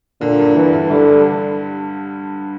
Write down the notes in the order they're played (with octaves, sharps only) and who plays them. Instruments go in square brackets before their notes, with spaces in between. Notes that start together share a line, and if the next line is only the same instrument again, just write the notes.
[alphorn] A#2 [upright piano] D3
[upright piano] G2
[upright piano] D3 [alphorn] E3
[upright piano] G2
[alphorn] D3 [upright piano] G3
[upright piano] G3